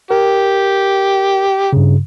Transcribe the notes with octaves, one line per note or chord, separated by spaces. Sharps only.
G4 A#4
G2 C#3